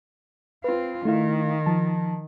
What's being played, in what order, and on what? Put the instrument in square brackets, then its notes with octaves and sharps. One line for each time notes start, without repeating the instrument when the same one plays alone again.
[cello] C4 F4 [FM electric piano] B4
[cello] D#3 [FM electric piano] A3 E4 F5
[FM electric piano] F3 A5